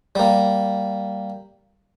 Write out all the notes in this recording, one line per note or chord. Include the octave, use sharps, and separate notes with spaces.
G3 A#3